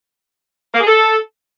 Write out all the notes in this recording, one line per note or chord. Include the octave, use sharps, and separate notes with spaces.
A#3
G#4
A4